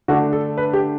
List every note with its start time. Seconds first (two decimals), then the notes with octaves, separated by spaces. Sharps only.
0.08 D3 A3 D4 F#4
0.33 A4
0.58 B4
0.73 G4